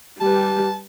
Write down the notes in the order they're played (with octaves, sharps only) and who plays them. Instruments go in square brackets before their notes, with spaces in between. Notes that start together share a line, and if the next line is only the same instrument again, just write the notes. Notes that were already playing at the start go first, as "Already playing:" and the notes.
[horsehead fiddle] G3 B4 [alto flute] G4 [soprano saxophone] A5